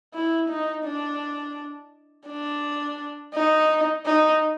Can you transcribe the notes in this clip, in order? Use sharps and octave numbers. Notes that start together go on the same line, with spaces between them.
E4
D#4
D4
D4
D#4
D#4